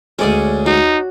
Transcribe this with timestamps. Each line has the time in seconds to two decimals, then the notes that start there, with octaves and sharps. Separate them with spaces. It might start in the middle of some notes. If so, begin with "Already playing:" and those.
0.19 D2 G#3 C#4 C#5 D5 G#5
0.66 D#4 F#4